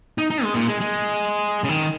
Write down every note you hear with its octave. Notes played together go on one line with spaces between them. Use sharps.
D#4
D#4
G#3
A#2
G#3
G#3
C#3
D#3